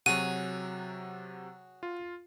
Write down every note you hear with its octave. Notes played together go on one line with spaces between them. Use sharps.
C3 F#3 F#4 G#4 C#5 D#7
F4